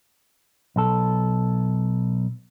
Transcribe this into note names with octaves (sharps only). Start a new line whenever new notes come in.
B1 A4